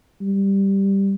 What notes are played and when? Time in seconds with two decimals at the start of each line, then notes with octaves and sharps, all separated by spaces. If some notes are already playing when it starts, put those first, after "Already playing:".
0.21 G3